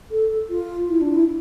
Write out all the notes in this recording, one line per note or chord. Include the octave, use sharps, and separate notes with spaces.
A4
F4
E4
D4
E4